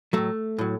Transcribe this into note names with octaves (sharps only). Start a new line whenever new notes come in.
A2 F#3 A3
A2 F#3